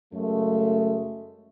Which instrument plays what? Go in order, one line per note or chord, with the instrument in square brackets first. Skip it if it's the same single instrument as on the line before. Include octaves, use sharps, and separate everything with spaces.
[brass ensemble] F#2 C#3 G#3 A3